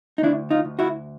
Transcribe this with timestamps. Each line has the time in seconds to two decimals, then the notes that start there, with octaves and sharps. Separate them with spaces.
0.18 D#4
0.22 D2 D4 E4
0.50 D#4 F4
0.65 D2
0.79 E4 F#4